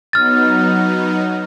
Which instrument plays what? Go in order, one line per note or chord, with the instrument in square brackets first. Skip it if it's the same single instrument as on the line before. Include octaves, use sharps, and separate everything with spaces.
[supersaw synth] F#3 B3 D#4 [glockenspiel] F6 A6